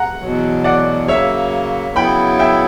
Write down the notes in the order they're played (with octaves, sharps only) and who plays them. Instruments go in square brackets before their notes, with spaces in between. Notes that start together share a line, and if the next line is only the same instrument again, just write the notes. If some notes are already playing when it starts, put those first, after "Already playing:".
Already playing: [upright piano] F#5 A#5
[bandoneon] E2 B2 F#3
[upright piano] D5 F#5
[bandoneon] C#3 F#3 A#3 [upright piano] C#5 E5
[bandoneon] C#3 F#3 B3 E4 [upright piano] G5 B5
[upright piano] E5 G5